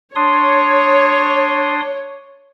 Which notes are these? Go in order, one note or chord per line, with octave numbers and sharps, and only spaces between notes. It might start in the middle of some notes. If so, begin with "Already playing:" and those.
D4 C#5 C6 D#6